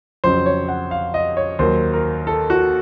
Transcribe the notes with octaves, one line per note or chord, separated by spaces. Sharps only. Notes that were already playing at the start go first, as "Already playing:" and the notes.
F2 C#3 F#3 C5
C#5
F#5
F5
D#5
C#5
D#2 D#3 F#3 C5
A#4
A4
F#4